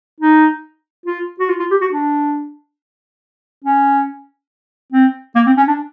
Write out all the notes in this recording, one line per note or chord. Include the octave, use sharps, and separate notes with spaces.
D#4
F4
F#4
F4
F4
G4
F#4
D4
C#4
C4
A#3
C4
C#4
D4